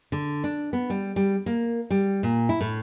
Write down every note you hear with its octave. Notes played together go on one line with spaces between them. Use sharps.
D3
D4
B3
G3
G3
A#3
G3
A#2
E4
A2